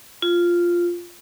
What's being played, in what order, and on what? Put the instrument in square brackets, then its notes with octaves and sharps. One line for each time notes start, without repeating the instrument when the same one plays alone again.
[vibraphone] F4